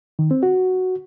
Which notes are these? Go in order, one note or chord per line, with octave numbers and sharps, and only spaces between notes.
D#3
C4
F#4